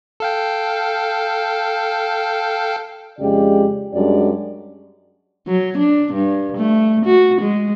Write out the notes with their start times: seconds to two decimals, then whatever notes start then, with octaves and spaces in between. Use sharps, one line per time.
0.20 A4 F5 G5
3.20 F2 C#3 G#3 G4 D5
3.94 F#2 G3 G#3 D4 D5
5.47 F#3
5.78 D4
6.13 G2
6.57 A3
7.05 F#4
7.41 G#3